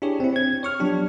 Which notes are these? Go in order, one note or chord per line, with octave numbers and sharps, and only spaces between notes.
D4 E4 G4 G#4 C#5
C4 E4
C4 G#6
C#5 C#6 F6
F3 F#3 B3 D4 G4